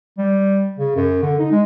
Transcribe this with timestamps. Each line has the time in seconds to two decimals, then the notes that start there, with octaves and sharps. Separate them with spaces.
0.18 G3
0.79 C#3
0.96 F#2
1.23 D3
1.39 D#4
1.51 G#3